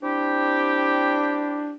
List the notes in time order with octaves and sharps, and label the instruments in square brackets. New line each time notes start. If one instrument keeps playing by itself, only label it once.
[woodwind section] C4 E4 G4 [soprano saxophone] D4